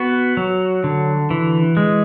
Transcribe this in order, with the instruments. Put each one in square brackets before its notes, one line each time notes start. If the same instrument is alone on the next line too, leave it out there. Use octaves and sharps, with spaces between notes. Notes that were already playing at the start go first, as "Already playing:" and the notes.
Already playing: [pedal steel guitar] B3 F#4
F#3
D3
E3
G#3